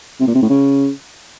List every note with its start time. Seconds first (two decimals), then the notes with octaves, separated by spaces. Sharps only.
0.20 C3
0.28 A#2
0.35 C3
0.42 A2
0.50 C#3